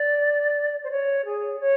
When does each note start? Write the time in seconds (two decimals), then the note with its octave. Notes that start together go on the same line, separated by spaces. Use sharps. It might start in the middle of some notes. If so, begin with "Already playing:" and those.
Already playing: D5
0.83 C5
0.91 C#5
1.25 G#4
1.60 C#5